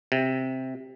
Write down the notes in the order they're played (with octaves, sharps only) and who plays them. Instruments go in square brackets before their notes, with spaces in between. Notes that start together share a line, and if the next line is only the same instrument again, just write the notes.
[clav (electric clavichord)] C3